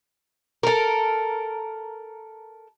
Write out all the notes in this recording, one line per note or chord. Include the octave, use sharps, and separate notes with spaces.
A4 A#4